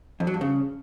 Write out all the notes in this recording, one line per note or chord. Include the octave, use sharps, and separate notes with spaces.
F2
F#3
G2
C#3